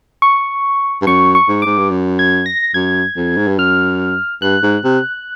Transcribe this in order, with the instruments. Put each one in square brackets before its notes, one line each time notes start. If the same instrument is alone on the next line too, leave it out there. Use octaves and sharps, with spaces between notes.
[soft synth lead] C#6
[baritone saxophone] G2
[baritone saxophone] F#2 [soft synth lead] C#6
[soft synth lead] C#6
[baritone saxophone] G#2
[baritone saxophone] G#2 [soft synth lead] D6
[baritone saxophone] G2
F#2
[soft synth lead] G#6
A#6
[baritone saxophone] F#2 [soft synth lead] G#6
[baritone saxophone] F2
G#2
G2
[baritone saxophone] F#2 [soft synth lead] F6
[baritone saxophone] G2 [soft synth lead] F#6
[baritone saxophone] G#2
C3